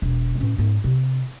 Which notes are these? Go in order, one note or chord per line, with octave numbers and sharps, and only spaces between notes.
E1
A2 C#4
G#2 B3
C3